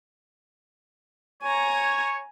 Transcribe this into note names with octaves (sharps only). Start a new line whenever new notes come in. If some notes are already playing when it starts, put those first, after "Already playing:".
C#5 G#5 A#5